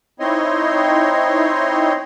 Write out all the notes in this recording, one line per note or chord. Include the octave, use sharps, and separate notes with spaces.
C4 D#4 E4 C#5 D#5 C6